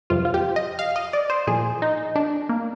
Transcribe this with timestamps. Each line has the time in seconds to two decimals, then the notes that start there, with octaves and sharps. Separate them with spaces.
0.10 F2 C3 F3 F4
0.25 F4
0.34 G4
0.56 D#5
0.79 F5
0.96 D#5
1.13 D5
1.30 C5
1.47 A#2 F3 G#4
1.82 D#4
2.15 D4
2.49 A#3